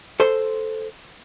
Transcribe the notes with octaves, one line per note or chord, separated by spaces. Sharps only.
A4 C5 C6